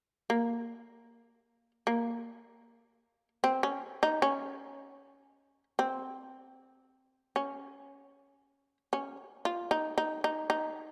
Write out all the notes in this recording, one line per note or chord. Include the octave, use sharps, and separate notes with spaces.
A#3
A#3
C4
C#4
D#4
C#4
C4
C#4
C#4
F4
D#4
D#4
D#4
D#4